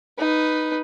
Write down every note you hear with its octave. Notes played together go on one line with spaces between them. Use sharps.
D#4 B4